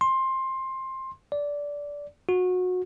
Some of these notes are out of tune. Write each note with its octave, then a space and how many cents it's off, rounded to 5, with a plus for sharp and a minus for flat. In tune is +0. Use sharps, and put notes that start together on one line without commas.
C6 +15
D5 -15
F#4 -25